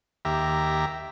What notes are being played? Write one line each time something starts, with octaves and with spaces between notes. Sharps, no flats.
D#2 G4 E5 A#5